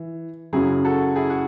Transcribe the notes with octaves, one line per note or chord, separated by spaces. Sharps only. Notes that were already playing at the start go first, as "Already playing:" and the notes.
Already playing: E3
F#2 C#3 F#3 E4 G#4
F#4 A4
E4 G#4
F#4